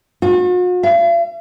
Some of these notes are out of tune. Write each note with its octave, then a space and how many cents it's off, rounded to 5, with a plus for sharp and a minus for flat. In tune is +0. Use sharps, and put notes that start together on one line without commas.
F#4 -45
F5 -45